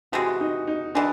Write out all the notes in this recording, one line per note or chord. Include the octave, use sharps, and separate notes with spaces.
C3 E3 G#3 F#4
D#4
D#4
E3 G#3 D4